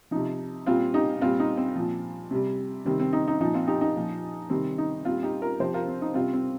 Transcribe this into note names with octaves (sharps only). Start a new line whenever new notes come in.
C3 F3 D#4
A#2 G3 C4 F4
D#4 G4
A#2 G3 C4 F4
D#4
C4
A#2 F3
C3 G3
C3 D#3 G3 C4
C4
D#4
D#4
A#2 F3 D#4
C4 F4
D#4 G4
D#4
A#2 F3
C3 D#3 G3 C4
D#4
A#2 G3 C4 F4
D#4 G4
F4 A#4
C3 F3 G4 C5
F4 A#4
C4
D#4
C3 G3 C4 F4
C4